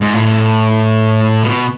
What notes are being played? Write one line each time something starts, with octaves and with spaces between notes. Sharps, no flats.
G#2
A2
B2